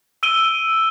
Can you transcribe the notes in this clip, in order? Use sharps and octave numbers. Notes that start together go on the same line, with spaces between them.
E6 D7 D#7 G7